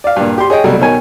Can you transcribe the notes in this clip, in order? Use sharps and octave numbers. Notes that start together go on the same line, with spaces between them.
D5 F5
G2 A#2
G4 C6
G#4 C#5 D#5 G5
C2 B2 F#3 G3 A3
B2 D#3 C#5 G#5